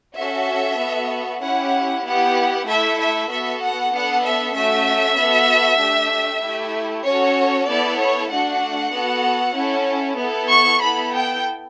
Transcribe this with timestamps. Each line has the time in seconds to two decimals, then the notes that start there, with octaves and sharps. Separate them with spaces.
0.17 C#4 F#4 A4 E5
0.80 B3 F#4 A4
1.43 C#4 E4 G4 F#5
2.05 B3 E4 G4 F#5
2.67 A3 E4 A4 E5
3.00 E5
3.30 B3 F#4 A4 E5
3.62 F#5
3.93 B3 D4 A4 F#5
4.24 E5
4.56 A3 C#4 F#4 E5
5.18 B3 F#4 A4
5.80 A3 D4 G4
6.44 A3 E4 G4
7.06 C#4 F#4 A4 C#5
7.68 B3 E4 A4 D5
8.00 C#5
8.31 A3 D4 F#4 F#5
8.94 B3 F#4 A4
9.56 C#4 E4 A4
10.19 B3 E4 A4
10.49 C#6
10.81 B3 E4 A4 B5
11.13 G5